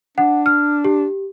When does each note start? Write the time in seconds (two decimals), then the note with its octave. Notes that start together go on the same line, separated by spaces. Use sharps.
0.18 D4 F#5
0.46 F6
0.84 G4